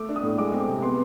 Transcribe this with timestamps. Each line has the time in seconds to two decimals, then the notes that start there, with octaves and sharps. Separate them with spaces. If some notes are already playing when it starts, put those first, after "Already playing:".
Already playing: A3 D6
0.09 D4
0.16 D#6
0.23 A2
0.38 G#3 D6
0.53 C4
0.60 D6
0.68 C3
0.82 B3 C6